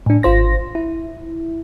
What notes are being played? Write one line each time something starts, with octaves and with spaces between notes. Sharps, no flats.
A2 D4
G#1 F4 C5 A#6
E4